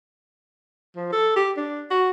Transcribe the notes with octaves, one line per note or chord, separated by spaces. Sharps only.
F3
A4
G4
D4
F#4